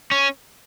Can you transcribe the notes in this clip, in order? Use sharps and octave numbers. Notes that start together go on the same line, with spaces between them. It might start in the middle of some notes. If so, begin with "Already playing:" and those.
C#4